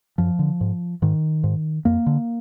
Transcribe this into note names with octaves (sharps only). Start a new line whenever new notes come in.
F#2 F3
D3
G#2
G#2 D#3
G#2
F2 A#3
D3